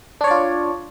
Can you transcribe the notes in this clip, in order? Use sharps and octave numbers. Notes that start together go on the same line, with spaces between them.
D4 F4 C#5 D5